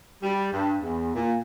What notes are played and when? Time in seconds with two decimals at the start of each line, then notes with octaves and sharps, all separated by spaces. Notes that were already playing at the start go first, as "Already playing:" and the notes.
0.21 G3
0.52 G2
0.82 E2
1.14 A#2